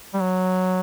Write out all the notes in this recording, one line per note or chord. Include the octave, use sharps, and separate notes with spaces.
G3
F#3